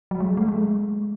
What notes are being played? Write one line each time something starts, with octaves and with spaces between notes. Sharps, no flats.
F#3
G#3
A3
G#3